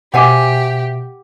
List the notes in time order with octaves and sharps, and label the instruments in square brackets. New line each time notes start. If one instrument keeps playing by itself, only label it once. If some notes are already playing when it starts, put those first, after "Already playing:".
[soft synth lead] B2 [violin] G4 [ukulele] C5 E5 G#5 [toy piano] F#5 D6